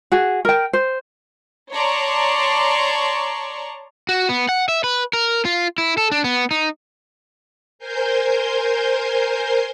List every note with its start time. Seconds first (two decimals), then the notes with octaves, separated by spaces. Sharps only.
0.12 F#4 G#4
0.45 A#4 G5
0.73 C5
1.72 C#5 D5 A5 A#5 C6 C#6
4.09 F#4
4.29 B3
4.49 F#5
4.68 E5
4.84 B4
5.13 A#4
5.45 F4
5.78 E4
5.98 A4
6.12 D4
6.24 B3
6.51 D#4
7.79 A#4 C5 G#5 C6 G6